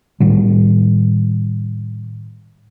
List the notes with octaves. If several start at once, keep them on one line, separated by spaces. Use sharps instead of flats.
A2 D#3 G3